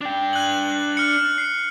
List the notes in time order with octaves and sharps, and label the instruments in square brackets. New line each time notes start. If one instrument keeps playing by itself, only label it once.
[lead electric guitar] D4 G5
[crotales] F#6 F#7
F6 C#7
C7